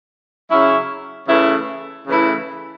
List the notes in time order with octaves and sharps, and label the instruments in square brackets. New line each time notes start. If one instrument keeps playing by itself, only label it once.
[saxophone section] C#3 F#3 C#4 E4
C#3 E3 A3 E4
C#3 E3 A3 E4